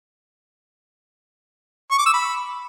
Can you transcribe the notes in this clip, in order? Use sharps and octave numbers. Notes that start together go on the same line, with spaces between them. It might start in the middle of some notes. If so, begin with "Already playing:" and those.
C#6
D6
E6
B5